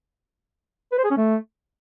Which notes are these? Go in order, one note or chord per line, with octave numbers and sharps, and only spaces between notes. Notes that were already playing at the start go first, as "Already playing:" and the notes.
B4
C5
G#4
C#4
A3